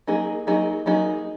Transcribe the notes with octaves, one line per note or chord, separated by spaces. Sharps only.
F#3 A#3 D#4 G#4
F#3 A#3 D#4 G#4
F#3 A#3 D#4 G#4